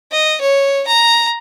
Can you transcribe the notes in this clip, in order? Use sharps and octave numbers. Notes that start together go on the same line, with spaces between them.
D#5
C#5
A#5